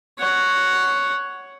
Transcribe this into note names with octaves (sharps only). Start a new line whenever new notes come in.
C#5 F#5